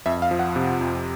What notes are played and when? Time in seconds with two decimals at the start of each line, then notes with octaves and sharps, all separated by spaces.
0.06 F2 E5
0.22 F5
0.31 F3
0.39 F#5
0.56 C3
0.81 F2